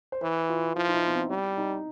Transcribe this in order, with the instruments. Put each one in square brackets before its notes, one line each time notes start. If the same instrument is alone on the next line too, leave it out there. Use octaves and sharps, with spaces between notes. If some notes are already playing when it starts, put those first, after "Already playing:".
[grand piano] C5
[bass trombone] E3 [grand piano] B4
[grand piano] F4
[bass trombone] F3 [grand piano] E4
[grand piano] D#4
E4
B3
C4
[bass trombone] G3
[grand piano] D#4